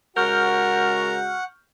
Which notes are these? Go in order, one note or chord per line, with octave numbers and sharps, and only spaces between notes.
C#3 G#3 F#4 A#4 F#5 C#6 F6 G6